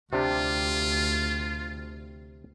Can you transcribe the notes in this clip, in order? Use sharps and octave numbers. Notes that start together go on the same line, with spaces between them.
D2 C3 D4 F4 G4